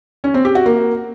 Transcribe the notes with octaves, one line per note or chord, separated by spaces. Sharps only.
C#4
C4
G4
F#4
A#3